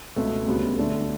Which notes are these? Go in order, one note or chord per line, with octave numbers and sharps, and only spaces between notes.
C#2 B2 A3
D2 C#3 G3 B3 F#4
D3 A3 D4 A4